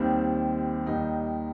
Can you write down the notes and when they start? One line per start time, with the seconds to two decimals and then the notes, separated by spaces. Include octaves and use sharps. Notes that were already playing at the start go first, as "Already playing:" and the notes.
Already playing: D#2 D#3 G3 C4
0.87 D#2 D#3 G3 D#4